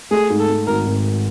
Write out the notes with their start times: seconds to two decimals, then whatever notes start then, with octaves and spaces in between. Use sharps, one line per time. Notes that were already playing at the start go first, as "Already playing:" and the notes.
0.11 A3 G#4
0.30 G#2
0.40 A4
0.49 A3
0.67 G#1 A#4
0.86 G#1